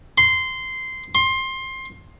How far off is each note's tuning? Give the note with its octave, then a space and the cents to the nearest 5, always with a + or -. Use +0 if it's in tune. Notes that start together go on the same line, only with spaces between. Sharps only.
C6 -10
C6 +20